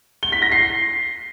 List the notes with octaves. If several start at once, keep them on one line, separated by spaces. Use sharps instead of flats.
G7
B6
A#6
C7